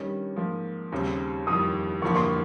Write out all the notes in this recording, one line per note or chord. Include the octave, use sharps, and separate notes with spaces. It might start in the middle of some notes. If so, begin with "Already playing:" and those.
Already playing: G2 D#3 G3 C#4
G#2 F3 A#3
D#2 C#3 G3 C4
F2 D#3 G3 D#6
G1 G2 F3 A#3 C#6
C6